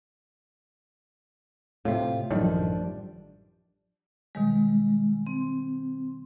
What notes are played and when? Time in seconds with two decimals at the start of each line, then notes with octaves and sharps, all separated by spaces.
1.85 A2 C3 F4
2.30 A1 F#2 D#3 F3 G3 D4
4.35 B2 D#3 G3 G#3
5.27 C4